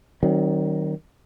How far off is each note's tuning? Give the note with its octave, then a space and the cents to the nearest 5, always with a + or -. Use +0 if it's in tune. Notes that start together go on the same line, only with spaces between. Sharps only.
D#3 +0 F#3 +40 C4 +40